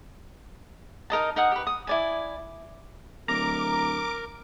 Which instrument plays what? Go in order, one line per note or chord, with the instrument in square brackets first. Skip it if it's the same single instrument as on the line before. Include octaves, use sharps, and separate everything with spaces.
[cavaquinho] D#4 A#4 D#5 A5
D#4 A#4 F#5 D#6
G4 B4
D#6
E4 D5 G#5
[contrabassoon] D1 [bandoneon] A#4 [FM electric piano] A#5 [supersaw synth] D6 D7